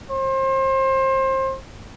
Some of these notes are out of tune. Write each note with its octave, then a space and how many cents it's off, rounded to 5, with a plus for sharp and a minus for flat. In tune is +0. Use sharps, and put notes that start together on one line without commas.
C5 +30